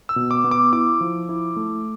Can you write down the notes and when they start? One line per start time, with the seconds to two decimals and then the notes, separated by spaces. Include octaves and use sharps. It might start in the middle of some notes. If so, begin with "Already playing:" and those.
0.09 E6
0.16 B2
0.31 D6
0.44 B3
0.51 D6
0.73 E4 D6
1.01 F3
1.29 E4
1.56 A3